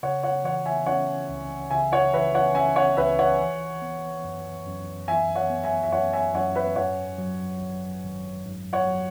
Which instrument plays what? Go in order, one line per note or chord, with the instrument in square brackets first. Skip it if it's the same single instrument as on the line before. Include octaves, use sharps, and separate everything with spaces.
[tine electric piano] C#3 [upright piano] C#5 F#5
[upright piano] C#5 F#5
[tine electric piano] E3 [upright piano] C#5 F#5
[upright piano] E5 G#5
[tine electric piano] C#4 [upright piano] C#5 F#5
[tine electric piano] C#2
[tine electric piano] C#3 [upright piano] E5 G#5
[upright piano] C#5 F#5
[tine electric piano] E3 [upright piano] B4 E5
[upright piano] C#5 F#5
[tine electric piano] C#4 [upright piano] E5 G#5
[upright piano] C#5 F#5
[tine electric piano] C#2 [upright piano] B4 E5
[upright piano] C#5 F#5
[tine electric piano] E3
B3
F#2
F#2
[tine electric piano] E3 [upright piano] E5 G#5
[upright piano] C#5 F#5
[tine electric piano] B3
[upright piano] E5 G#5
E5
[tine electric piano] F#2 [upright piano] C#5 F#5
[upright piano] E5 G#5
[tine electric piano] F#2 [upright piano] C#5 F#5
[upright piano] B4 E5
[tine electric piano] G#2 [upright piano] C#5 F#5
[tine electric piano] F#3
G#1
G#1
G#2
[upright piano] C#5 F#5
[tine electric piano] F#3